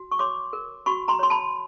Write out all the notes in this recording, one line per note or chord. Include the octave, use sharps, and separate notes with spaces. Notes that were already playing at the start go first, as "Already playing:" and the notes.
Already playing: F#4
C#6
C#5 C6 D6
A#4
F#4 B5 C#6
A#5 C6
C#5 C6
A5 B5